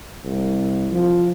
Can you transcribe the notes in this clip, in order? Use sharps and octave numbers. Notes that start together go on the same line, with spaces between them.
C2
F3